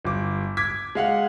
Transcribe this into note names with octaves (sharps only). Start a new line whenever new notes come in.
G1 D6
D6 G#6 B6
G#3 F5 F#5